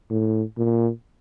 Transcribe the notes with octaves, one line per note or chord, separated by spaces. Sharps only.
A2
A#2